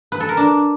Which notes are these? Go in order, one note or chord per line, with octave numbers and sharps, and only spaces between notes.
B4
A4
A#4
D4